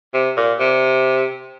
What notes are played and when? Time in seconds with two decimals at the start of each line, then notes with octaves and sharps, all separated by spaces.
0.14 C3
0.37 A#2
0.60 C3